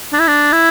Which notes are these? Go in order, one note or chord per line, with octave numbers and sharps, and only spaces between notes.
D4
E4
D4
E4